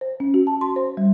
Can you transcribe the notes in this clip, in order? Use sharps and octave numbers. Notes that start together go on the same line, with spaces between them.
C5
C#4
F#4
A5
C6
C5
G3